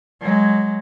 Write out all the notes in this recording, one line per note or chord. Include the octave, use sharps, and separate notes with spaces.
F#3 G#3